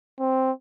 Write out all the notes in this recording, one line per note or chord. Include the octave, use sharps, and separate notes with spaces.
C4